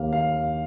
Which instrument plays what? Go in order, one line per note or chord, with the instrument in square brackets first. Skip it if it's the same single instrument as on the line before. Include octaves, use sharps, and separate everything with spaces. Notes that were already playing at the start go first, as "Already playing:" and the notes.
Already playing: [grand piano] D#2 D#3 A#3 F5
F5